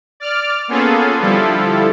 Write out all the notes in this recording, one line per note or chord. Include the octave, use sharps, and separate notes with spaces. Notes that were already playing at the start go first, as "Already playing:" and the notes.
D5 F6
A#3 B3 C#4 F4 G#4 A4
D3 F3 G3 E4 F4 A4